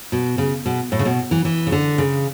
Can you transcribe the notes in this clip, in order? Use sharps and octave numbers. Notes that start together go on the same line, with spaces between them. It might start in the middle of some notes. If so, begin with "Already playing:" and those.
B2
C#3
B2
A2
C#3
B2
E3
E3
C#3
D3
C#3